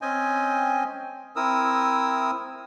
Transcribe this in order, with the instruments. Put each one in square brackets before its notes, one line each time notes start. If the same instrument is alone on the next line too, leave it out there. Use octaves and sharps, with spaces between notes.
[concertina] C4 C#4 D#5 G5 G#5
C4 E4 A#4 D#6 E6